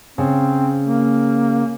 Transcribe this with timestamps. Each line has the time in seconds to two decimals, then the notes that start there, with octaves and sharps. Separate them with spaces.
0.18 C#3 C4
0.85 A#3